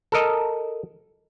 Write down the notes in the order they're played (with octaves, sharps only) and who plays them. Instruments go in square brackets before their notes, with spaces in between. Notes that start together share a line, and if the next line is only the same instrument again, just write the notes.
[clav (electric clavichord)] A4 A#4 D#5